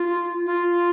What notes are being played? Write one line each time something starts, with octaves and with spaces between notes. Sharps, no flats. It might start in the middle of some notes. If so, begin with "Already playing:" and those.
Already playing: F4
F4